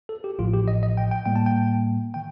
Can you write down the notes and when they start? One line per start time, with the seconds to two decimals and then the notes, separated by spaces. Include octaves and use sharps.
0.09 A4
0.24 G4
0.39 A1 A2 F3 F4
0.53 G4
0.68 D#5
0.83 D#5
0.97 G5
1.11 G5
1.25 A2 G3 A#3 G5
1.36 A5
1.46 G5
2.14 D#3 G5